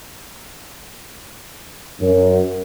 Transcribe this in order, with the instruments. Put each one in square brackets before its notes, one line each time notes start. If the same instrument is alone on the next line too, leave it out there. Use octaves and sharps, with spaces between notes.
[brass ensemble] F#2